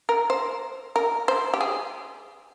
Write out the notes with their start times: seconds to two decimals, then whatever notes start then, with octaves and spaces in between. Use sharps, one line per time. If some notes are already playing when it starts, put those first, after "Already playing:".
0.09 A#4
0.30 C5
0.96 A#4
1.28 C5
1.54 G4
1.61 G#4